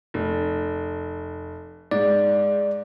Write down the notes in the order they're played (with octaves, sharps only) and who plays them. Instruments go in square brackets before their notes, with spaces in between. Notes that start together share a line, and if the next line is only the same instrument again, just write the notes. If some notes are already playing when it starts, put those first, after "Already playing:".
[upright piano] F1
[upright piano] G#2 [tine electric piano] D5